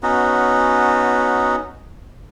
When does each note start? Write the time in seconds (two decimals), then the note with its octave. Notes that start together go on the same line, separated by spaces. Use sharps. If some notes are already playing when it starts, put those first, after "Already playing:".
0.03 B3 C#4 D#4 F#4